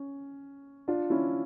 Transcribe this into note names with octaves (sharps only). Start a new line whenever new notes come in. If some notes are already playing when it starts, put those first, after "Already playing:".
Already playing: C#4
D4 F4
C#4 E4